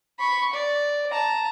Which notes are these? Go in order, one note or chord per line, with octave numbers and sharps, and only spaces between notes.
B5 C#6
D5
A5 A#5